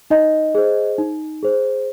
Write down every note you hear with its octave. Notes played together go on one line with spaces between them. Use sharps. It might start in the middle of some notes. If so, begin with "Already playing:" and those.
D#4 D#5
G#4 C5
D#4
G#4 C5